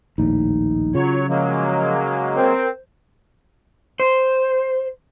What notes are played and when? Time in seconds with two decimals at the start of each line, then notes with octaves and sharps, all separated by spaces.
0.18 A#1 D#2 A2 D#4
0.95 C#3 F#3 F4 C#5
1.29 F3 F#3 G#3 A#3
2.36 C4 A#4 C5
4.00 C5